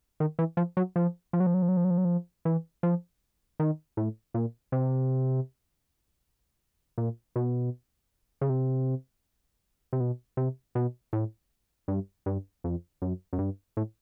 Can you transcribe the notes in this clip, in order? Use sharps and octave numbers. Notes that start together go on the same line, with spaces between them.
D#3
E3
F3
F#3
F3
F3
F#3
F3
F#3
F3
F#3
F3
F#3
F3
F#3
F3
E3
F3
D#3
A2
A#2
C3
A#2
B2
C#3
C3
C3
B2
C3
B2
A2
G2
G2
F2
F#2
F#2
G2
A2